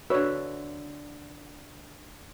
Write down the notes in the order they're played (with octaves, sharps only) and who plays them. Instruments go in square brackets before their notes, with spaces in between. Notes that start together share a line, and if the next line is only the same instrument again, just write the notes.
[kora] D3 E5 [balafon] F#4 [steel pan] B4 C#5